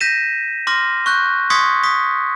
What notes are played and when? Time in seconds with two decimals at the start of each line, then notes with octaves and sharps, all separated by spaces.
0.01 G6 A#6 B6 D#7 E7
0.67 C6 D6 F6 A#6
1.06 C#6 F#6 G6
1.50 C6 C#6 D#6 G#6 B6 C#7
1.83 C#6 D#6 B6